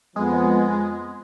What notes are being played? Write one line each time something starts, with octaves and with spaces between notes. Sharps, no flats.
F2 F3 G#3 B3